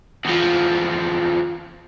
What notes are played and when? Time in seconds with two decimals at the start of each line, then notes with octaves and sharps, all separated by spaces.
0.25 E2 F3